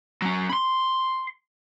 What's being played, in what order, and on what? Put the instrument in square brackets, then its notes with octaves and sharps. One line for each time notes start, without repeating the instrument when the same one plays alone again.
[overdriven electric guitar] F#3 C#4
B5 C6